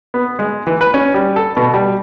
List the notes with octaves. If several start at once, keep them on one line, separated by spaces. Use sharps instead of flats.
B3
G#3
E3
B4
C#4
G3
A4
B2
G3